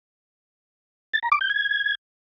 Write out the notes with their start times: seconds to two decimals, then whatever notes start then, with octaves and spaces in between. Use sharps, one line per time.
1.14 A6
1.23 A#5
1.32 D6
1.41 G6
1.50 G#6